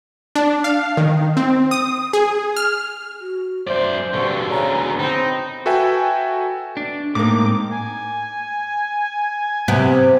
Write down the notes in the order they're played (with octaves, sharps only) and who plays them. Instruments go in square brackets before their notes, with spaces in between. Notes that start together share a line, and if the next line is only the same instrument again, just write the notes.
[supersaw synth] D4
F5
D#3
C4
D#6
G#4
F6
[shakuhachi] F#4
[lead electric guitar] F#2 D5 [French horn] C5 [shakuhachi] E5
[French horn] G2 [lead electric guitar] B2 D3 [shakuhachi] C#6
[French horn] C#3 [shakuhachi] A#5
[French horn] C4 [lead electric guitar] D#4 [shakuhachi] B5
[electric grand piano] F#4 A4 B4 E5 G5 G#5
[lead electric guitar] D4
[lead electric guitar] A2 [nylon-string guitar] G#3 A#4 [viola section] A#3 C4 D#4 [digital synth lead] D6
[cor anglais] G#5
[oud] C3 B3